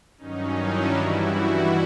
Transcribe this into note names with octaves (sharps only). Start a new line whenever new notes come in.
G2 D#3 F#3 C#4 D#4
D4 E4
G2 E3 G3 E4 F#4